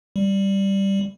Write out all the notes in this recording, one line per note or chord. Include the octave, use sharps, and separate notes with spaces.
G3